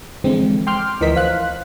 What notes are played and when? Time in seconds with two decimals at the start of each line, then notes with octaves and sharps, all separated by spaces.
0.24 D3 E3 F3 G#3 C4
0.67 G5 C6 D6 F6 G6
1.01 D2 E3 F3 A#4 D#5 B6
1.15 C5 F5 F#6